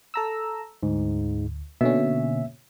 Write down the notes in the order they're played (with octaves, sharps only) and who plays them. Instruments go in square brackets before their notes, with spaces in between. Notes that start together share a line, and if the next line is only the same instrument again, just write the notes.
[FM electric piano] A4 A#5 E6
[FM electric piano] D2 [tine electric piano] G#2
[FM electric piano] B2 D3 C#4 [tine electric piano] A#3 E5